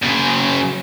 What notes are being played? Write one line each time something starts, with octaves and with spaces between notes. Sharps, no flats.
F#2 C#3